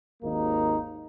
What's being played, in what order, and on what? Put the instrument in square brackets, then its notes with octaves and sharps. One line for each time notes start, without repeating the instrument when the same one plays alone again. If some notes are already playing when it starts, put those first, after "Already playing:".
[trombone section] G#1 D#2 A#3 D#4